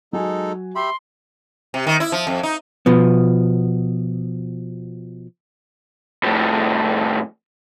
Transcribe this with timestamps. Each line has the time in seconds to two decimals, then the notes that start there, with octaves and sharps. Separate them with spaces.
0.13 F#3 G#3 D#4 F#4 A4 G#5
0.75 G4 E5 B5 C6
1.74 C3
1.87 D#3
2.00 E4
2.12 F3
2.27 F2
2.43 D#4
2.86 B2 F3 B3
6.24 F2 A2